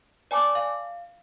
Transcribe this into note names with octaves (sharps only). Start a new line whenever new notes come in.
D5 G#5 A5 D6
F5